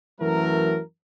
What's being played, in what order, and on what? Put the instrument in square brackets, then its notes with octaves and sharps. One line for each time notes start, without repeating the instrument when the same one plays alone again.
[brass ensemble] F#2 E3 F#3 A3 A#4